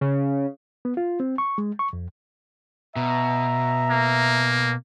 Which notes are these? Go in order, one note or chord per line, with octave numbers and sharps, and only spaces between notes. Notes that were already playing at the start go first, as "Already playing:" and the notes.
C#3
B3
F4
C4
C#6
G#3
C#6
F2
B2 E5 A#5
A#3